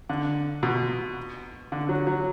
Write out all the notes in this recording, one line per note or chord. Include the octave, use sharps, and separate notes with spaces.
D3
B2
D3
F#3
F#3